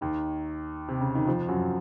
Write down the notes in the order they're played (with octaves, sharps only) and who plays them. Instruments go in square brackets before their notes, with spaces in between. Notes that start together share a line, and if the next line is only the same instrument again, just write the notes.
[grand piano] D#2 D#3
C3
C#3
D#3
F2 F3
F#2 F#3